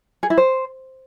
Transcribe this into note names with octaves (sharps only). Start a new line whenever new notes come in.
G#4
E4
C5